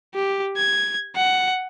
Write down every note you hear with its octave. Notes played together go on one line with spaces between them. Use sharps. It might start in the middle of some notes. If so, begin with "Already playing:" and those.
G4
G#6
F#5